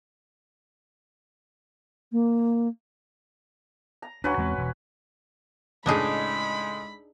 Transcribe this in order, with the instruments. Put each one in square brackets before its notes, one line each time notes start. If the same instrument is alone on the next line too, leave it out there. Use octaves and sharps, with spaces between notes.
[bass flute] A#3
[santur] A#5
[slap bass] D2 D4 [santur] F#3 C#4 B4
[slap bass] E2 G#3 C4
E1
[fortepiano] C#2 A2 [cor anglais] G#3 [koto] D4 D#4 G#4 [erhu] B5